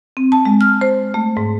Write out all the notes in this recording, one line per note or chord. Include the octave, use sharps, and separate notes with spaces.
C4
A5
G#3
F6
C5
A3
G#2